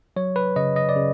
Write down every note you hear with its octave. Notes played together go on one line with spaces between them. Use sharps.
F#3 C#5
B4
C#3 D#5
D#5
D5
C#3